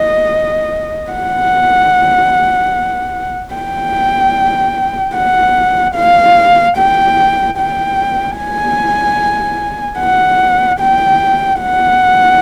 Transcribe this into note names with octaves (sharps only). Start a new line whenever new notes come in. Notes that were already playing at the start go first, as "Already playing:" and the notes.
Already playing: D#5
F#5
G5
F#5
F5
G5
G5
G#5
F#5
G5
F#5